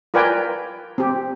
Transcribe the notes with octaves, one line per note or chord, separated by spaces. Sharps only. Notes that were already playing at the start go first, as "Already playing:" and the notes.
F4 A#4 B4 D5 G5 G#5
C4 G4